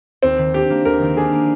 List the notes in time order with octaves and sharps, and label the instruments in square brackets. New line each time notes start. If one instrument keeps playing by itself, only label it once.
[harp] D#2 [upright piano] C4
[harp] D#3
[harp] D4 [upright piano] G4
[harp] A#3
[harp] D#2 [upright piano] A#4
[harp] D#3
[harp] D4 [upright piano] G#4
[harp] A#3